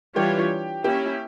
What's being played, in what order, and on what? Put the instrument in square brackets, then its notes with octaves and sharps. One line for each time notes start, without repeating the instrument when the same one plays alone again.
[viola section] E3 G3 D4 F4 C#5 [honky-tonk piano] G4
[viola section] A#3 C#4 E4 [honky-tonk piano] G4